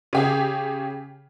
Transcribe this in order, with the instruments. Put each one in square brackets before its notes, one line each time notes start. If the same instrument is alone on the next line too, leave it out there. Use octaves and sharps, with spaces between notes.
[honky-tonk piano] C#3 G4 G#4